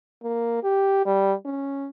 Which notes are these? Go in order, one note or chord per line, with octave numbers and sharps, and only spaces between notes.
A#3
G4
G3
C#4